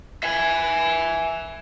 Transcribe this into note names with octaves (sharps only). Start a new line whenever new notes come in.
E5 G#5